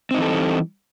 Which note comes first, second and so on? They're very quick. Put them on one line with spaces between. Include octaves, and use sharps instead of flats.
C4 D#4 E3 A4 G3